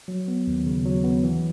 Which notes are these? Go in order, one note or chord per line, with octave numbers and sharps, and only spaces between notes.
F#3
B3
D#2
C#3
F#3
B3
E3